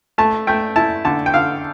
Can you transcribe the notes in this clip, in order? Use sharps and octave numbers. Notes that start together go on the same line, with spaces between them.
A3 A5
A3 G5
E4 A5
D3 A5
G5
D3 F5